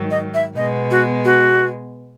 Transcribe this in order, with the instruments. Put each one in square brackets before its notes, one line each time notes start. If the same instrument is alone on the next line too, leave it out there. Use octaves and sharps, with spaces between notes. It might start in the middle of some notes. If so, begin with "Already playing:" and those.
Already playing: [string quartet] G#2 D#3 F#3
[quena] D#5
E5
[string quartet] B2 G#3 B3 [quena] D#5
[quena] F#4
F#4